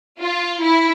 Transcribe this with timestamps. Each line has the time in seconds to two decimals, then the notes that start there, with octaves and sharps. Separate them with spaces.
0.19 F4
0.63 E4